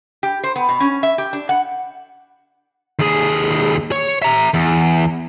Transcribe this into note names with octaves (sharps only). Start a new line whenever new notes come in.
G4
C5
B3
B2
C#4
E5
G4
D4
F#5
D#2 G#4
C#5
E5 A#5
E2